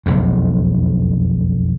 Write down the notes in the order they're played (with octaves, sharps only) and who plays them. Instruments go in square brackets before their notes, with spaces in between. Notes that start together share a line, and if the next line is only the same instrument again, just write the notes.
[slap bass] F1 B1 E2